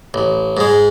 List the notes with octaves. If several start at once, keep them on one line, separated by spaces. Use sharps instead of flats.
A1
G#2 G#3